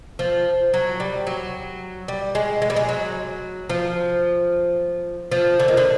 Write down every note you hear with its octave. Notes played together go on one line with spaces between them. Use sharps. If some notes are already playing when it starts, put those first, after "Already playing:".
F3
F#3
G3
F#3
G3
G#3
G#3
G3
G#3
F#3
F3
F3
D3
D#3
D3